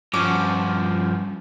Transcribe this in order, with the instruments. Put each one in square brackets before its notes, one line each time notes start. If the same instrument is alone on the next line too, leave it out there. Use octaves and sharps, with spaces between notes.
[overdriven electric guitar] G2 F3 [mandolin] C#4 F#4 D6